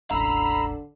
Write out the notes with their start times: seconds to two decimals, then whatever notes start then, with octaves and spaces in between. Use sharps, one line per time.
0.11 E1 A1 D3 A#5 B5 E6 C7